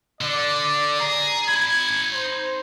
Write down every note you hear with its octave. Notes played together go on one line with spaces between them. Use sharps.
D3 D5
G#4 A#5
D#4 B5 G#6
C5